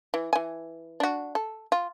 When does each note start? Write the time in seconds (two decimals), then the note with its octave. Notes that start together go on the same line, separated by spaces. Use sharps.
0.14 E3
0.33 E3 G#5
1.00 D4 F#4
1.35 A4
1.72 F4